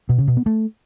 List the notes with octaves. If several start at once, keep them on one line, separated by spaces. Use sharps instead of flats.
B2
C#3
B2
B3
A3